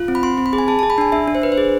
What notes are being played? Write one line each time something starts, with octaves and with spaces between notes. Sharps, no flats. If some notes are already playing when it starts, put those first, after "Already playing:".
Already playing: F4
C4
B5
C4 C6
C4
B5
G#4
G#5
G#4 A5
A5
G#4
B5
D4 G#5
D4 E5
D4
C5
D4 B4
C5
G#4